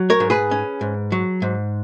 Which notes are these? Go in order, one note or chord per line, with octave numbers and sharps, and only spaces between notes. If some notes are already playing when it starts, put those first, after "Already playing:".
Already playing: F#3
A#4 C#5
G#2
G#4 B4
C#4
G#2
F#3
G#2